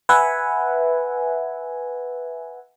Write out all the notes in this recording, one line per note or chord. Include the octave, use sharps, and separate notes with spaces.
B4 E5 F#5 G#5